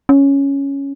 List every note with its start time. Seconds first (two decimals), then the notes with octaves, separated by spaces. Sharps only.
0.09 C#4